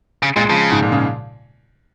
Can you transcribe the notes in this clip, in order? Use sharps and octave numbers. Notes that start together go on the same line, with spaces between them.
C#3
A#2 G#3
C#3 F3
G#2
A#2
C#3